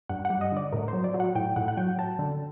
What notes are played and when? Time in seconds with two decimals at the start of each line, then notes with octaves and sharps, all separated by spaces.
0.09 G2 F#5
0.25 F#5
0.30 G3
0.41 D#5
0.52 D3 D5
0.72 A2 A#4
0.88 F#3 C5
1.04 D5
1.14 F#3
1.20 F#5
1.35 A2 G5
1.56 A2 F#5
1.68 F#5
1.77 F#3 G5
1.98 F#3 A5
2.19 D3